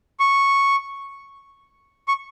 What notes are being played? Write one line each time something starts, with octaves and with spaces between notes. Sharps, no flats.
C#6
C#6